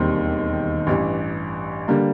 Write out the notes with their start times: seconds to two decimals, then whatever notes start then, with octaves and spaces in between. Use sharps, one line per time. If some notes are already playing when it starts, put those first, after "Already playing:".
Already playing: E1 D#2 D#3 G3 C4
0.87 A1 G2 E3
1.88 D3 G3 A#3